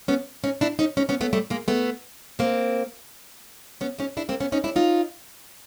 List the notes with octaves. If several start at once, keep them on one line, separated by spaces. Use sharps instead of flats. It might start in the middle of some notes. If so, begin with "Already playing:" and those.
B3 C#4
C#4 D#4
D4 E4
C#4 D#4
C#4 D#4
B3 C#4
A3 B3
G3 A3
G#3 A#3
A3 B3
A#3 C4
B3 C#4
C#4 D#4
D4 E4
A#3 C4
B3 C#4
C#4 D#4
D4 E4
D#4 F4